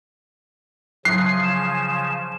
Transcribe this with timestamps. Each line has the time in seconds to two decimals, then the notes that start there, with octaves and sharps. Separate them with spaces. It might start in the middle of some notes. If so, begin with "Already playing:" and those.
1.05 C#3 F3 F#3 G#5 C7
1.43 E7